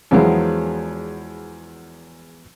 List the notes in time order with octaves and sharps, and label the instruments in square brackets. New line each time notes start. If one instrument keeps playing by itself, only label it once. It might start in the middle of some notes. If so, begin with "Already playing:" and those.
[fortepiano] E2 F3 F#3 G#3 B3 E4